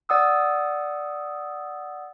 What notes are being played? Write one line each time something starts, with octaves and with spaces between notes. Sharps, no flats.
D5 F#5 D#6 E6